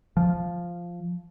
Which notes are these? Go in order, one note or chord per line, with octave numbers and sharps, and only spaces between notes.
F3